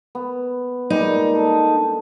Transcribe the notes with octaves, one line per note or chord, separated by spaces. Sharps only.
B3
A#2 G3 G#3 D#4
D4 A4